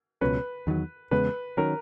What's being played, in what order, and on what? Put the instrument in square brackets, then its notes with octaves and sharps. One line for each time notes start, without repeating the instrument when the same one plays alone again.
[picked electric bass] C#2 B2 F#3 C#4 [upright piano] B4
[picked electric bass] E2 D#3 F#3
[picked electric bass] E2 C#3 G#3 B3 [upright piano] B4
[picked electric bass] D#3 F#3 C#4 [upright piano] A#4